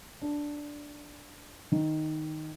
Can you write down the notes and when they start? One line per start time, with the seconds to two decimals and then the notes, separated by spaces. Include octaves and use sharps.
0.22 D4
1.72 D#3